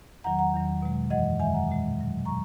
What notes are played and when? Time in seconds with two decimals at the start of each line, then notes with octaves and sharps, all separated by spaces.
0.24 E2 D#3 F#3 F#5 A#5
0.39 F#5 A#5
0.53 E2 D#3 F#3
0.82 B2 G#3
1.10 F#2 E3 G#3 D#5 F#5
1.40 E2 D#3 G#3 E5 G#5
1.54 F#5 A#5
1.68 A#2 G#3
1.97 B2 F#3
2.25 B2 F#3 A#5 C#6